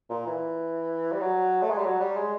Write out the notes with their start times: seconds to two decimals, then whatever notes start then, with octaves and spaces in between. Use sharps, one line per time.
0.10 A#2
0.26 E3
1.12 G3
1.21 F#3
1.62 A3
1.70 G#3
1.77 G3
1.85 F#3
2.01 G3
2.17 G#3